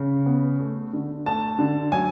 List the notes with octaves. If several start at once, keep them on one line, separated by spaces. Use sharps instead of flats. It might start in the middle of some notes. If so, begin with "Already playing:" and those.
Already playing: C#3
B3
A3
D3
A3 A5
D3
F#3 G#5